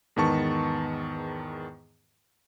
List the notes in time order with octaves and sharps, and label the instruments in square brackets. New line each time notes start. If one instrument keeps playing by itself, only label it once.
[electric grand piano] E2 G#2 D#3 B3 A5 C#6